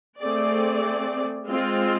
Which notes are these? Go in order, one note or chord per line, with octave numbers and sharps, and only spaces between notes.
A3 C4 G#4 D5
G#3 C4 F4